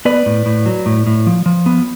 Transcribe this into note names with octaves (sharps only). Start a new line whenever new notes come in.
B3 B4 D5
A2
A2
F#3
A2
A2
F3
F3
B3